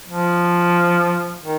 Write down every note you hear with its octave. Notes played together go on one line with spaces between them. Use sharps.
F3
D#3